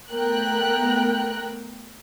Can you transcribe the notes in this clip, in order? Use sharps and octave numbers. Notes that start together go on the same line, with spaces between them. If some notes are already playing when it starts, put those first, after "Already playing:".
A3 B3 A#4 G5 F#6